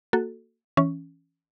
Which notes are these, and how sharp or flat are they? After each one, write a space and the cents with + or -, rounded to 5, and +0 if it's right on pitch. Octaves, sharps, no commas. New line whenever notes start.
A#3 -20 F#4 -5 A4 +0
E3 -5 C#4 +0